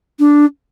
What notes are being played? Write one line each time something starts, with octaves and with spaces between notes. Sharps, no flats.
D4